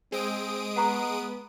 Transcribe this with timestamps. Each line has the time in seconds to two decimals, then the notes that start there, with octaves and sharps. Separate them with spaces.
0.12 G#3 C4 D#6 D7
0.76 B3 F#5 A#5 C#6